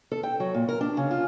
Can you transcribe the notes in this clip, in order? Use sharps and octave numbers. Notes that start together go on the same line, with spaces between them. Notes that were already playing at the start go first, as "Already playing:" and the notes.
A4
G5
F#3
A#2
A#4
D4
C#3
F4